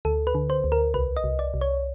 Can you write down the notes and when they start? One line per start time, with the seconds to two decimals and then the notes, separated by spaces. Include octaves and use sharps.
0.05 D2 A4
0.27 B4
0.35 D3
0.50 C5
0.64 D2
0.72 A#4
0.94 C2 B4
1.17 D#5
1.24 C2
1.39 D5
1.54 C2
1.61 C#5